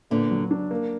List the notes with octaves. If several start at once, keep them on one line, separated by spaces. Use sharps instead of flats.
A#2 D3 B3
F#3
D4
A#3